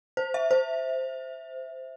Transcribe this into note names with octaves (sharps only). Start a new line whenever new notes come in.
C5
E5
C5